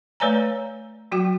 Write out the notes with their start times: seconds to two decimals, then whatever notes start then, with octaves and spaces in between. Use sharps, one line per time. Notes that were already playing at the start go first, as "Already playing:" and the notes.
0.20 A3 B4 C#5 D5 G#5 A#5
1.12 F#3 F#4 G5